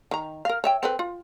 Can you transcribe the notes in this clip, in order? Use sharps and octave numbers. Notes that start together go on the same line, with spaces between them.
D#3 A#5
A#4 F5
C#5 E5 G5
C4 A4 B4
F4